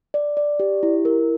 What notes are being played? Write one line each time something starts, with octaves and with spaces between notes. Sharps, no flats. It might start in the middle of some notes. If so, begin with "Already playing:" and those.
D5
D5
G4
E4
A#4